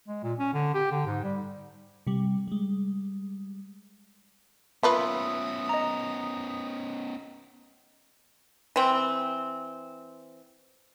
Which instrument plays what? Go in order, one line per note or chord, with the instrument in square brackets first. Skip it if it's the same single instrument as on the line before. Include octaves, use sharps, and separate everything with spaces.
[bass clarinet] G#3
A#2
C#4
D3
G4
D3
G#2
G3
[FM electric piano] C3 G3
G3 G#3
[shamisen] A#3 F4 B4 [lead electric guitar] B3 C#4 [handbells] E5 [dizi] D#6
[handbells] D#5 A#5
[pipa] E3 C4